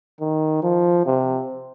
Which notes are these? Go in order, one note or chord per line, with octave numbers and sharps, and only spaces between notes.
D#3
F3
C3